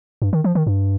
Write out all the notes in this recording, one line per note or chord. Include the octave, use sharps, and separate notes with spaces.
G2
D#3
F3
D#3
G2